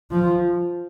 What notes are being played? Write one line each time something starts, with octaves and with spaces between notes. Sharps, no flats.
F3